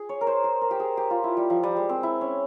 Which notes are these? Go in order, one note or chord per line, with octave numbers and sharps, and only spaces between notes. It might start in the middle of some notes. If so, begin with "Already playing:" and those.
Already playing: G#4
C#5
A#4
C5
C5
A#4
G4
G#4
G4
F4
E4
G3
F3
G3
G#3
C4
E4
C#4